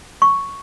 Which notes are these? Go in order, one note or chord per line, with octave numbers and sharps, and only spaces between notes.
C#6